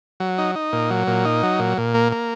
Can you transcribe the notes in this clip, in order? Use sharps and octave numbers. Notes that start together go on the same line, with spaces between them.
F#3
D#4
D#4
A#2
F#3
A#2
D#4
F#3
A#2
A#2
A#3
A#3